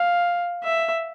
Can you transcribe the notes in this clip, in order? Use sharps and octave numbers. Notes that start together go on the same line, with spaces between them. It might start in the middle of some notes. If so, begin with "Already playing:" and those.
Already playing: F5
E5